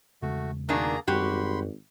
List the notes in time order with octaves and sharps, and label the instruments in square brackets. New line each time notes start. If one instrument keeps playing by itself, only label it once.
[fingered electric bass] E2 C#3 G#3 [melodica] A3 F#4
[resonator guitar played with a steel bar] B2 D#3 D4 [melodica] A#3 G#4 A#5
[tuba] G#1 [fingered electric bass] F#2 G3 C#4 [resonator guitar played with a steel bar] F#4 G4 [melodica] B5 C6